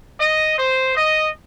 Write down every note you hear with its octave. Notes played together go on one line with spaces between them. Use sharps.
D#5
C5
D#5